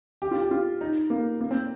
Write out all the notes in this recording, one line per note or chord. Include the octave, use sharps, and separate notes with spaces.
G4
F4
G4
F4
D#4
A#3
A#3
C4